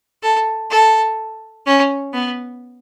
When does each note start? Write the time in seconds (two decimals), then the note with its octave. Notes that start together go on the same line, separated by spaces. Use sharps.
0.23 A4
0.71 A4
1.66 C#4
2.14 B3